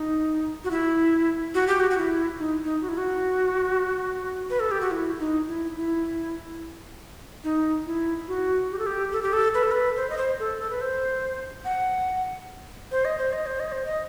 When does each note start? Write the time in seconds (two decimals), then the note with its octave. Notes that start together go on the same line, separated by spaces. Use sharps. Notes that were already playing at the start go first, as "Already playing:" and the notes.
Already playing: D#4
0.64 F#4
0.71 E4
1.54 F#4
1.67 G4
1.80 F#4
1.90 F#4
1.98 E4
2.39 D#4
2.64 D#4
2.82 F#4
2.89 E4
2.98 F#4
4.50 B4
4.60 A4
4.71 G4
4.81 F#4
4.91 E4
5.19 D#4
5.47 E4
5.77 E4
7.44 D#4
7.86 E4
8.28 F#4
8.71 G4
8.79 A4
8.86 G4
9.12 A4
9.23 G4
9.33 A4
9.54 B4
9.63 A4
9.71 B4
9.96 C5
10.10 D#5
10.17 C5
10.39 A4
10.60 A4
10.70 B4
10.81 C5
11.65 F#5
12.92 C5
13.05 D#5
13.18 C5
13.33 D#5
13.46 C5
13.60 D#5
13.72 C5
13.86 D#5